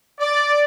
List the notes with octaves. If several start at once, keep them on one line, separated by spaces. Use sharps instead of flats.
D5